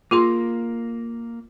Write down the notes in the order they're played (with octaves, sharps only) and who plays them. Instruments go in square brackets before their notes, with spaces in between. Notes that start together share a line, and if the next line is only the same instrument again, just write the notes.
[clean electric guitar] A#3 [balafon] F4 G#4 C6